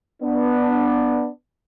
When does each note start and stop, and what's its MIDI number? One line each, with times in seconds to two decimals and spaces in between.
0.23 1.28 59
0.23 1.28 62